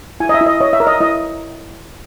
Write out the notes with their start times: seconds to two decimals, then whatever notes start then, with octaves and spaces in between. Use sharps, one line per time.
0.20 E4 G#5
0.29 D#5
0.34 E5
0.41 E4
0.46 D#5
0.60 C#5 D#5
0.73 E5
0.80 A#4
0.87 D#5
1.00 E4 D#5